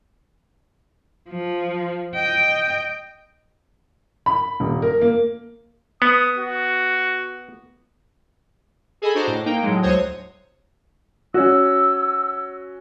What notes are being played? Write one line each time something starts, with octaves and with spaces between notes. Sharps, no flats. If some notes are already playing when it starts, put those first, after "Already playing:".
F3
D#5 G5
B5
D#1
A#4
A#3
B3 D#6
F#4
G#4 A4 D#5 G#5 B5
D4 F#4 C5 D#5 A#5 D6
A2
A#3 D#4 G5
A2 F#3 G#3
D2 F#3 C5 C#5 D#6
C#4 F#4 E6